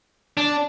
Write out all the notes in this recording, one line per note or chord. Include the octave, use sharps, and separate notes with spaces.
D4